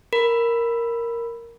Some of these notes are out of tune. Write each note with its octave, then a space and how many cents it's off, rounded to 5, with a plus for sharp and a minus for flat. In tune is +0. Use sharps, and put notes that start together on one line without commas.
A#4 +0 B5 +0